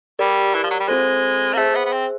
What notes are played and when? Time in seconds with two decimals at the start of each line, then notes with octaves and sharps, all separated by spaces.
0.19 G3 G4 A#4 D5
0.54 E3
0.63 F3
0.71 F#3
0.80 G3
0.88 G#3 C4 F4 A4 C5
1.53 A#3
1.57 A3 G#4 C5 E5
1.75 B3
1.85 B3
1.92 C4